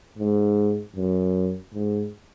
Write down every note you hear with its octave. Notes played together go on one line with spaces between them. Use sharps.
G#2
F#2
G#2